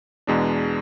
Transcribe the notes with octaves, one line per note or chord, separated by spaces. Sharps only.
E2 B2 G#3 D4